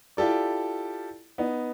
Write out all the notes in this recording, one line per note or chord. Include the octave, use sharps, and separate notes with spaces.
E4 F4 G4 A4 D5
B3 D#4